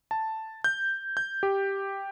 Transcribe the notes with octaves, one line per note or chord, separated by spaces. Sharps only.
A5
G6
G6
G4